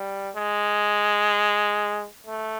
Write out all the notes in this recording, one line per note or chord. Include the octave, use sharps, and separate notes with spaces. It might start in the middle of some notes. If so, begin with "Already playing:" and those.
Already playing: G3
G#3
A3